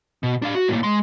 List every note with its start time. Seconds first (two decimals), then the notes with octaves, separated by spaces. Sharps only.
0.23 B2
0.42 D4 F5
0.55 F#4
0.68 A2 A#3
0.83 G#3 C6